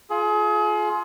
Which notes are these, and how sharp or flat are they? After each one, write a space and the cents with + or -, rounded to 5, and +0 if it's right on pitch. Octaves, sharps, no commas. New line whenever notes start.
F4 +0 G#4 +35